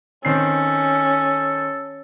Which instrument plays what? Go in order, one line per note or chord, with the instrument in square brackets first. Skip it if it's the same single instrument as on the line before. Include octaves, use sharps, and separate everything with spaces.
[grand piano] D#3 C4 C7 [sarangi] C#4 [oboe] A4